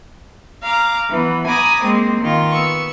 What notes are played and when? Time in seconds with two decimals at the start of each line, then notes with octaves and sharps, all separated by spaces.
0.62 F5 A#5 D6
1.09 E3 B3
1.47 G#5 A#5 B5 D6 D#6
1.82 G#3 A#3 C4
2.20 D#3 F4
2.52 B3 C#6 E6